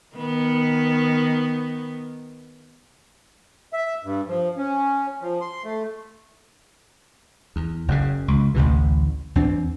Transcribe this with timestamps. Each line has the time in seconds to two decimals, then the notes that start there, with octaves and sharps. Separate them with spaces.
0.16 D#3 B3
3.73 E5
4.04 G2
4.28 F3
4.57 C#4
5.21 F3
5.41 C6
5.64 A3
7.56 E2
7.88 F#1 F#2 C#3
8.28 C#2
8.55 A1 D2 C3 E3
9.35 E2 C4 D4